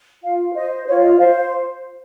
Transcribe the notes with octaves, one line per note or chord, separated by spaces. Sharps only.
F4 F5
C5 D#5
F4 C#5
D#5
C5 F5